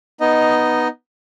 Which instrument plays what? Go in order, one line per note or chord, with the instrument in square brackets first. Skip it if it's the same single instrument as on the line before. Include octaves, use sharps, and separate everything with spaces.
[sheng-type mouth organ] B3 D#4 D#5